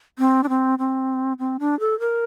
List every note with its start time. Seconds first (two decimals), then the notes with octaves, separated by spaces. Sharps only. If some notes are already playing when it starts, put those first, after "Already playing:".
0.19 C4
0.43 D4
0.49 C4
0.79 C4
1.39 C4
1.60 D4
1.80 A4
2.00 A#4